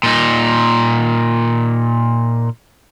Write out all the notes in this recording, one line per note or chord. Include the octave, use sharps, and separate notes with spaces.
A#2 D#4